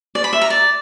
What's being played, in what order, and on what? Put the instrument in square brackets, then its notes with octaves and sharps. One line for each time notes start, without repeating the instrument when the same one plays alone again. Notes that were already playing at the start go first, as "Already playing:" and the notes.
[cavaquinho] D5
B5
E5
A#5
D5